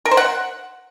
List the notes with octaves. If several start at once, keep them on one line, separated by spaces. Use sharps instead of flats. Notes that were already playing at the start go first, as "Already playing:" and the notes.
A#4
C5
F#5